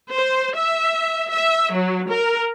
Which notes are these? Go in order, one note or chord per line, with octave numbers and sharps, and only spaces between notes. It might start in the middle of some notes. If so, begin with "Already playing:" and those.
C5
E5
E5
F#3
A#4